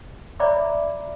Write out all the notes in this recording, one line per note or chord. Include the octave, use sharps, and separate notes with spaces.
C#5 D5 E5 A#5 B5 D6